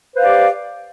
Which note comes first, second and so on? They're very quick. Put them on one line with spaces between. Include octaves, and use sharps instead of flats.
C5 B4 F5 D5 G4